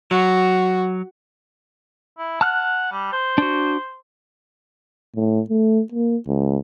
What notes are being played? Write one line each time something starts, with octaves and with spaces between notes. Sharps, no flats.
F#3 F#4
E4
F#5 A5 F6 F#6
G3
C5
D4 F#4
A2
A3
A#3
C#2